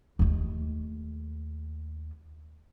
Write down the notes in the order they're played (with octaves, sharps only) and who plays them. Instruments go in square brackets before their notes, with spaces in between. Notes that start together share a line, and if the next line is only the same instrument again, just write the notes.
[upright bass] D#2 A3